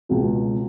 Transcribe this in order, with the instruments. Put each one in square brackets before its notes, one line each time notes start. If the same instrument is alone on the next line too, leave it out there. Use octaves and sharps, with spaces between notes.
[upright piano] C#2 B2